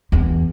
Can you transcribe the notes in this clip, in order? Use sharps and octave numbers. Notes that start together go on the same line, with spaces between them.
E2